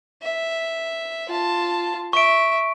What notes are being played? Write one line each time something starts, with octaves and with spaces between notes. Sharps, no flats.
E5
F4 A5
E5 C#6 D7